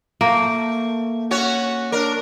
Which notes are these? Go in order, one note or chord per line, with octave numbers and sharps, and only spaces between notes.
A3 A#3
C#4 F#4 C#5
D4 A#4